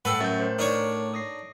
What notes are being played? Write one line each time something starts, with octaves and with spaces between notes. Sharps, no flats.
A2 A4 B4 F#5 G5
F#2 G6 A6
A#4 C5
D4 D#4 A#4 C#5
D#6 A#6 C7